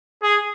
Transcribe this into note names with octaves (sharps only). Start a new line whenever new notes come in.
G#4